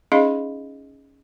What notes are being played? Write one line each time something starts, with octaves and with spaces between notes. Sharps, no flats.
C#4 D#4 G#4 D#5 F5 B5